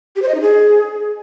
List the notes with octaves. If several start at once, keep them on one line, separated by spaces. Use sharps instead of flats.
G4
C5
D#5
D#4
G#4